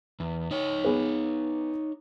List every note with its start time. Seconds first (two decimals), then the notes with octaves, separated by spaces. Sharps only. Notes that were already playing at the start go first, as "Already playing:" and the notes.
0.20 E2
0.51 D#4 C#5
0.84 B3 G#4 B4